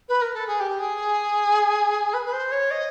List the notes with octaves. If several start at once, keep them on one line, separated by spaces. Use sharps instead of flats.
B4
A#4
A4
G#4
G4
G#4
B4
B4
C5
C#5
D#5